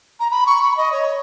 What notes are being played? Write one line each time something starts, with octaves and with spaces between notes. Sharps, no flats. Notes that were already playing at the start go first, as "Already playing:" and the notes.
A#5
B5
C#6
B5
D#5
C#5